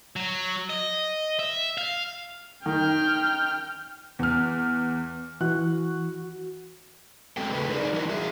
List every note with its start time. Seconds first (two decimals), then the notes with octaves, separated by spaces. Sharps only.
0.16 F#3
0.69 D#5
1.39 E5
1.78 F5
2.66 D#3 G5 F6
4.19 E2 F6
5.41 E3 F#4 F#6
7.37 E2 G#3 C4 F#4 A4 G5
7.51 C#3 A3 B4
7.69 D#4 F#4 G#4 A#4 C#5 D5
7.94 E3 G3 D4 E4 F#4 A#4
8.09 F#4 G#4 E5